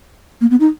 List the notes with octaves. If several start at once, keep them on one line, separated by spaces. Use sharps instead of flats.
A#3
B3
D#4